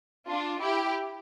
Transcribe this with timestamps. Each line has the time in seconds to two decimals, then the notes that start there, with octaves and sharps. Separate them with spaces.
0.28 D4 F4
0.60 E4 G4